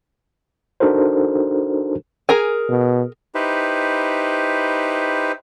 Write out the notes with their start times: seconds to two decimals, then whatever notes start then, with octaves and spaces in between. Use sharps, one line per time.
0.80 D4 D#4 F#4 A4 A#4 C5
2.29 G#4 A#4 G#5
2.69 B2
3.35 D#4 E4 G4 B4 C5